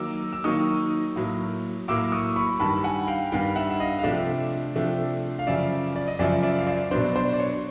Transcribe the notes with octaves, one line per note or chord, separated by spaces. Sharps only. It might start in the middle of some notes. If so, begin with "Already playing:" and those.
Already playing: D#3 F#3 A#3 D#4 D6 E6
E6
D#3 F#3 A#3 D#4 C#6 D#6
A2 F#3 A#3
A2 F#3 A#3 D6 E6
C#6 D#6
B5 C#6
G2 D#3 G3 A5 B5
F#5 G#5
F5 G5
G2 D#3 G3 F5 G5
E5 F#5
E5
D#5 F5
F5
C3 F3 A3 D4 D5 E5
C3 F3 A3 D4
F5
F#2 C#3 F3 D5 E5
D5
D#5
F#2 C#3 F3 D5 E5
D5 E5
F5
D5 E5
B2 F#3 B3 D4 C5 D5
C5 D5
D5
C#5